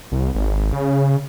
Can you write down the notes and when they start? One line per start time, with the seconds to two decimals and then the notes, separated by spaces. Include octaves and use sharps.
0.12 C2
0.35 G#1
0.73 C#3